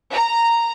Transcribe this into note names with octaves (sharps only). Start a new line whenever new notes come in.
A#5